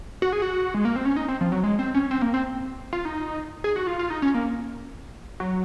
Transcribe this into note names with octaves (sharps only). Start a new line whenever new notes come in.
F#4
G#4
F#4
G#3
A#3
C4
C#4
D#4
C4
F3
F#3
G#3
C4
C#4
C4
A#3
C4
F4
D#4
G#4
F#4
F4
F4
D#4
C#4
A#3
F#3